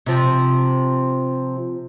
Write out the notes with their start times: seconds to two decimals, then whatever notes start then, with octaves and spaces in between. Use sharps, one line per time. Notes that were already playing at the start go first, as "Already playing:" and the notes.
0.06 C3 F3